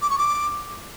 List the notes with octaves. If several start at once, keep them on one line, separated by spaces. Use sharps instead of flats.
D6
C#6
D6